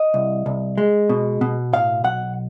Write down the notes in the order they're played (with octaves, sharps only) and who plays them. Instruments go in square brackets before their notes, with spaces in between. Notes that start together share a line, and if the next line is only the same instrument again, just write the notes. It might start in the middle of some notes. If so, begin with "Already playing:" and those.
Already playing: [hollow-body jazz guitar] D#5
C2
C2
G#3
B2
B2
A2 F5
B1 F#5